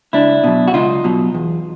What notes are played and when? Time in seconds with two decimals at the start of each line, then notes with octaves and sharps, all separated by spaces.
0.13 C#2 D4 E4
0.44 B2 F#3
0.68 F#4
0.73 C#2 D#4 F4
1.04 B2 F#3
1.34 E2